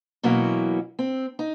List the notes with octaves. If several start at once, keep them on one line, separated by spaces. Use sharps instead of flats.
B2 E3 F#3 A#3 C#4
C4
D#4